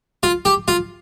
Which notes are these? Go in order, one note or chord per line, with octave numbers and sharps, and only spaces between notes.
F4
G4
F4